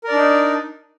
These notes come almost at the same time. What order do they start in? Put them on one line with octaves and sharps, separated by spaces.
A#4 D5 D4 D#4